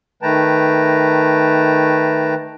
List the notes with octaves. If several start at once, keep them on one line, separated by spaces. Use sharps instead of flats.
D#3 A3 B4 G5 A5 A#5